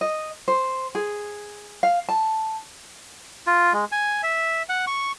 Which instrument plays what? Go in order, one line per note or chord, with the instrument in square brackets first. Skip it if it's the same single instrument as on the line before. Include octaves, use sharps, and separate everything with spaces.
[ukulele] D#5
C5
G#4
F5
A5
[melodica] F4
G#3
G#5
E5
F#5
C#6